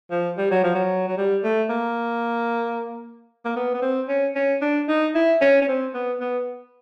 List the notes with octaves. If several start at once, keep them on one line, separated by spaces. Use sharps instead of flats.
F3
G3
F#3
F3
F#3
F#3
G3
A3
A#3
A#3
B3
B3
C4
C#4
C#4
D4
D#4
E4
C#4
C#4
C4
B3
B3